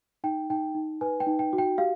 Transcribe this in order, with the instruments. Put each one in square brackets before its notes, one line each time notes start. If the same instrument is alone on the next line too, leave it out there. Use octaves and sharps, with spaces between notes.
[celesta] D#4 G5
D#4 G5
D#4
B4 G#5
G5
D#4
G5
F#4
G5
G4 F5